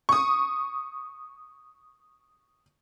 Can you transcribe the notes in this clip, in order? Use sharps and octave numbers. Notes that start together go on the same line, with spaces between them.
C#6 D#6